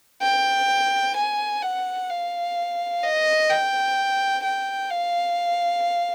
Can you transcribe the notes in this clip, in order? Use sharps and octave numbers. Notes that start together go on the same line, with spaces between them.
G5
G#5
F#5
F5
D#5
G5
G5
F5